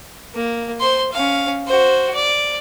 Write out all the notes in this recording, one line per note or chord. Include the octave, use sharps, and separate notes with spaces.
A#3
C5 C6
C#4 F5
F#4 C5
D5